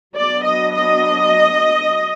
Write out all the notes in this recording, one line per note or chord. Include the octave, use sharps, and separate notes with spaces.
F#3 B3 D4 D5
D#5
D#5